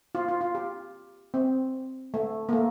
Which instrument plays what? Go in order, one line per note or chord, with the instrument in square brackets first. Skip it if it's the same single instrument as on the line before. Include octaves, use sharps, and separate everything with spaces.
[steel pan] F4
F4
F4
G4
C4
A3
A#3
A3